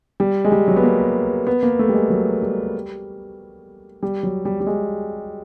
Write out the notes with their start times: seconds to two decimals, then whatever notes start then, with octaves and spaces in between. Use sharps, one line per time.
0.20 G3
0.45 G#3
0.52 G3
0.68 F#3
0.76 B3
0.83 A#3
1.47 B3
1.63 A#3
1.79 A3
1.89 G3
1.94 G#3
2.10 F#3
2.42 G3
4.03 G3
4.23 F#3
4.45 G3
4.60 G3
4.66 G#3